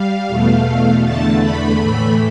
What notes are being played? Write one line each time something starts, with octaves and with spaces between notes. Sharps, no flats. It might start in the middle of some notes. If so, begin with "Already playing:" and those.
Already playing: G3 F5
E2 B2 A3
E2 D3 A3 A5
B5
A2 E3 A3